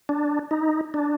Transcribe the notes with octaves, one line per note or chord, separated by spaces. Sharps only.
D4
D#4
D4